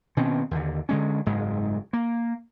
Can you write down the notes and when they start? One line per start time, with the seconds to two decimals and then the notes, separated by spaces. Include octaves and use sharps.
0.17 B2 D#3 C4 C#4
0.51 D#2 D3
0.89 D3 G#3 C#4
1.26 F#1 G#2 G#3
1.93 A#3